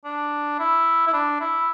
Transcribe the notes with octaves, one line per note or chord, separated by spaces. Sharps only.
D4
E4
E4
D4
E4